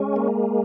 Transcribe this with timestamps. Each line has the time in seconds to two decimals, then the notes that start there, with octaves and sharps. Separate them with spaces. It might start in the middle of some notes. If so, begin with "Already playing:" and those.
Already playing: G#3 C#4
0.16 A#3